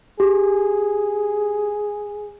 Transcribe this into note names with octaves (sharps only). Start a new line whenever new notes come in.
G4 G#4